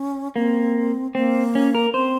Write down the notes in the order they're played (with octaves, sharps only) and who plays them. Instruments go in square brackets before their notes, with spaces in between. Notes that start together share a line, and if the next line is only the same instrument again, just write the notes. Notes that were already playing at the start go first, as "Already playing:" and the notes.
Already playing: [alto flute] C#4
[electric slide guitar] A#3 [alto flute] C4
[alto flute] A#3 [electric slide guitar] C4
[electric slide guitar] C#4
A#4
[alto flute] C4 [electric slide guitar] C5